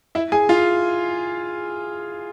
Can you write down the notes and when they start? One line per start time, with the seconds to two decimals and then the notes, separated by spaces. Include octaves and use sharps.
0.15 E4 E5
0.32 G#4 G#5
0.49 F4 F5